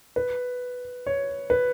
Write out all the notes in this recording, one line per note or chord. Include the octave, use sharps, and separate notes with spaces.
B4
C#5
B4